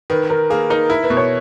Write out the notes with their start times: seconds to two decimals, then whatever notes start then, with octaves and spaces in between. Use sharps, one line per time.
0.10 D#3 B4
0.29 D#3 A#4
0.50 A#3 G#4
0.70 D#4 A#4
0.90 E4 A#4
1.04 B4
1.10 B2
1.17 C#5